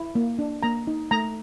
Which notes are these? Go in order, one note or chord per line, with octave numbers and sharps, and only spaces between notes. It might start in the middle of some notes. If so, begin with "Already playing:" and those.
Already playing: E4
A#3
D4
A#3 A#5
D#4
A3 A#5